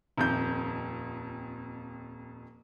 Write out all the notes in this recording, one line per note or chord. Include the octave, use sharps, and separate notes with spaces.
D#1 F2 G6